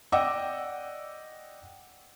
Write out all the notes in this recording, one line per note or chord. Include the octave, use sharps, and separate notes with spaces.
D5 D#5 F#5 G5 D6 E6